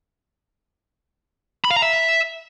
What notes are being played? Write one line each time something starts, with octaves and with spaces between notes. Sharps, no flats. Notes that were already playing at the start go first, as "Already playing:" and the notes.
B5
F5
A#5
E5